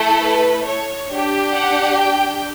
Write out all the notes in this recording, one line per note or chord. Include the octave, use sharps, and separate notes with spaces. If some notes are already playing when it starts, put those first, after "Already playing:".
Already playing: A3 E4 A4
B4
C#5
D4 G4
F#5
G5